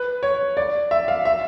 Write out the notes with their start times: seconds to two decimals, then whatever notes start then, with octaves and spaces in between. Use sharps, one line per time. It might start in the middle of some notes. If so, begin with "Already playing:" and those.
Already playing: B4
0.23 C#5
0.57 D5
0.91 E5
1.08 F5
1.25 E5